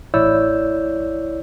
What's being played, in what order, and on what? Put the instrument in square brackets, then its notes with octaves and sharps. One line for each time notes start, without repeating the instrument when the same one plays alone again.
[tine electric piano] A1 E4 C#5 D5 E6 G6